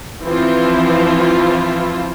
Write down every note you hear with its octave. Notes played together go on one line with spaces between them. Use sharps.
E3 F3 C4 E4 F4